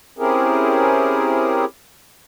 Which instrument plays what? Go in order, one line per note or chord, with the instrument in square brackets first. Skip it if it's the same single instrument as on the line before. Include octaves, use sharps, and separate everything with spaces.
[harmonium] C4 C#4 E4 G4 G#4 A#4